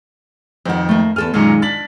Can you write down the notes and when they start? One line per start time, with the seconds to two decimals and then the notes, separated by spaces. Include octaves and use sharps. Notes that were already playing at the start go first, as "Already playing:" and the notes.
0.66 F2 D#3 C5 F#5
0.89 A3 A#3
1.16 E2 A4 G#5 F6
1.34 F#2 A#2 D#3 G#3 A#5
1.62 D4 A6 B6 F#7